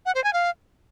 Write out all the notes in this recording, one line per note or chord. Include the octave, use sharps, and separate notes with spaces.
F#5
C5
G#5
F5